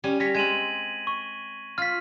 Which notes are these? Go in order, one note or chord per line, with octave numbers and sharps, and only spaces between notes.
G3 C#4 G#5
G3 C#5 A#6 B6
G#3 C4 G#6 D#7 F#7
C#6
F4 F6 B6